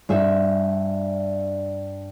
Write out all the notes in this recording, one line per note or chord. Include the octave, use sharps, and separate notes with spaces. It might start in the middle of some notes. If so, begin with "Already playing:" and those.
G2 G#4 E5